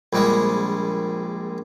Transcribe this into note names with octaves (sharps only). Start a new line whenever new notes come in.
A#1 G3 G#3